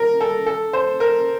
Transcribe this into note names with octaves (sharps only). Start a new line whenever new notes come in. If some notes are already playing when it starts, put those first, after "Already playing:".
Already playing: A#4
A4
A4
C5
A#4